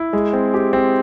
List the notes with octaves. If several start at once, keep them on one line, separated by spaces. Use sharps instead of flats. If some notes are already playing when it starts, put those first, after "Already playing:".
Already playing: E4
G#3
C4
G4
C4